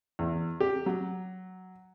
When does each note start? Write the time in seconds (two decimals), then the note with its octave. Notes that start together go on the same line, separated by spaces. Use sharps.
0.19 E2
0.60 G4
0.86 F#3